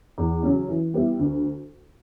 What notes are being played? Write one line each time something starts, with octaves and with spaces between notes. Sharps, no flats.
E2
C#3 F#3 C#4
E3
G3 B3 E4
D2